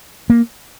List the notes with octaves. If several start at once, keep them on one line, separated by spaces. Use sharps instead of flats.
A#3